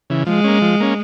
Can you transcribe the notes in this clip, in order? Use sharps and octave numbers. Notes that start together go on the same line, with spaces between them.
C#3 E3
F3 G#3
A#3 C#4
F3
A#3 C#4